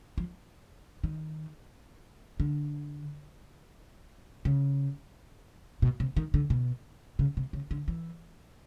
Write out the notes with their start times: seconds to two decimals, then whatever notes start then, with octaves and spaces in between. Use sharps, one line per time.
0.18 F3
1.04 D#3
2.40 D3
4.45 C#3
5.82 B2
6.00 C3
6.17 D#3
6.34 D3
6.50 B2
7.19 C#3
7.37 C3
7.53 C#3
7.71 D3
7.88 E3